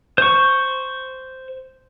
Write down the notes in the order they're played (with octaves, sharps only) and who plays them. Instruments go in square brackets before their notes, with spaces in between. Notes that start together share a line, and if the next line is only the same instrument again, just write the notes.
[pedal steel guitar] C5 C#6